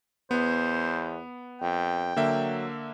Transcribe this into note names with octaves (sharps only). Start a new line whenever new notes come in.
E2 B3 C5
F2 G5
D3 F#3 A#3 E5